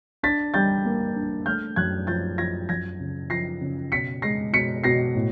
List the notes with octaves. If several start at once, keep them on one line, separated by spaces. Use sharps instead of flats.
D4 A6 B6
G3 G6 A6
A#3
D4
A3 F6 G6
F#2 F#6 G#6
F3 G6 A6
F3 G#6 A#6
F#2 G#6 A#6
C#3
F3 A#6 C7
C#3
B2 B6 C#7
G#3 A#6 C7
B2 B6 C#7
B2 A#6 C7
A2